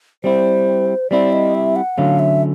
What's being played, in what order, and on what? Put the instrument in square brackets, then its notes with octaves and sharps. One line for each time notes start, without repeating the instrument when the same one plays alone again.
[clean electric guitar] G3 C4 E4 [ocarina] C5
[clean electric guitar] G3 C4 E4 [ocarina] D5
[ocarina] D#5
E5
F#5
[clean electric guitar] D3 F#3 A3 C#4 [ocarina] F5
[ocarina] E5